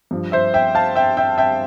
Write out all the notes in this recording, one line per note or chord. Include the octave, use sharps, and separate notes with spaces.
G2 F3
C5 E5
E5 G5
F5 A5
E5 G5
E5 G5
E5 G5